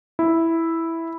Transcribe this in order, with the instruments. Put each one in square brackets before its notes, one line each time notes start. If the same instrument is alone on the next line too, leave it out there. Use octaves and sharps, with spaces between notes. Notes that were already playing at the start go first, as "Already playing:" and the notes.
[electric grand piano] E4